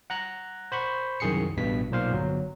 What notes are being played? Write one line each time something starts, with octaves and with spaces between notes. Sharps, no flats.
F#5 A#5 F#6
C5 B5 C#6
C2 F#2 D#3 G#4 C7 C#7
A1 G2 B2 B6
B1 A#2 C5 F5
G1 F#3